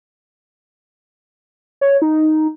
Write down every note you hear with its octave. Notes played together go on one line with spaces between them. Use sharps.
C#5
D#4